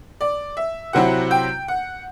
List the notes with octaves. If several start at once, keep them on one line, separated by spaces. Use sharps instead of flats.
D5
E5
C3 F#3 C4 E4 F#5
G5
F#5